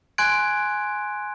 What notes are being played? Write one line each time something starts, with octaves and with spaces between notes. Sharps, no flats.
G#5 C6 F#6 G#6 D7